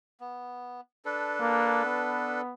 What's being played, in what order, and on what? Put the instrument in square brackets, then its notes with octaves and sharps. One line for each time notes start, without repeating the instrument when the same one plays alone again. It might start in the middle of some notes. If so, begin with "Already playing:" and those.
[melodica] B3
D4 A4 B4
[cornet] A#3
B3